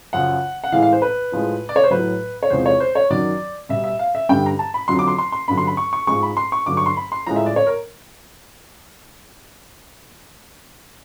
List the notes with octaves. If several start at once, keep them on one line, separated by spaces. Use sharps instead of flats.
F#2 C#3 F3 F#5
F#5
A2 E3 G#3 F5
F5
C5
B4
A2 F3 G#3
D5
C#5
C5
A2 F#3 B4
C#5
E2 C3 F3 G#3 C5
C#5
C5
C#5
F#2 D#3 F#3 D5
B2 G3 E5
E5
F5
E5
G2 D3 G3 G5
A#5
A5
B5
F2 D3 F#3 C6
D6
C6
C6
C6
G2 D3 F#3 B5
C6
B5
C#6
C#6
G#2 F3 G#3 C#6
B5
C6
C#6
G2 D3 F#3 D6
C#6
C6
B5
C6
A2 F3 G#3 A#5
E5
D5
C#5
A#4